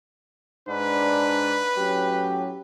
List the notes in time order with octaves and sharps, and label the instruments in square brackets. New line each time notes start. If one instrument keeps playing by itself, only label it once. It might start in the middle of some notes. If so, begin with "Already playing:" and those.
[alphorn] G#2 [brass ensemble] D4 [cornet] B4
[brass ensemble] A2 F#3 C#4 [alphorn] G4